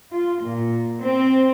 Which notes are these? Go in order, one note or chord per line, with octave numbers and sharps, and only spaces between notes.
F4
A#2
C4